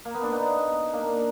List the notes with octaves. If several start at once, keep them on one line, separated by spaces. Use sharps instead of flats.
A#3
B3
D4
B3 D#4
A#3 D4